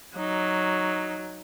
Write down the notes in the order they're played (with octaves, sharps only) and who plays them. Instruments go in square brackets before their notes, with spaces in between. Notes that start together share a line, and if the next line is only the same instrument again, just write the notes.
[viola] F#3 [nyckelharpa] D#4